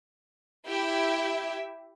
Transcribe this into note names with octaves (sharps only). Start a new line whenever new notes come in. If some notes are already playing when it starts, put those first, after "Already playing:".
E4 G4 E5